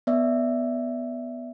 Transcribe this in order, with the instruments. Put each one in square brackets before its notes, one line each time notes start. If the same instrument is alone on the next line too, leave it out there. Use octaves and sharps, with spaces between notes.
[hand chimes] B3 D5 E5